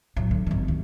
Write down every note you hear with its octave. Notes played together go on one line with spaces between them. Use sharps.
A2 F#3
D3
G#1 D#3
D2